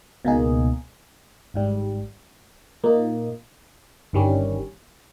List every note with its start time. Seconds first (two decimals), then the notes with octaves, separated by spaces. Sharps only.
0.25 C#2 B2 A#3 D#4 G#4
1.54 G#1 G#2 G3
2.84 A#2 A#3 D#4
4.13 G1 G2 D#3 G3 C#4